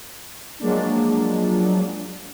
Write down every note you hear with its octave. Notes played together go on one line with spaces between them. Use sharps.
F3 F#3 G#3 A#3 D4